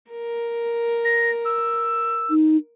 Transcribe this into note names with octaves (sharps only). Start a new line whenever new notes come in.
A#4
A#6
E6
D#4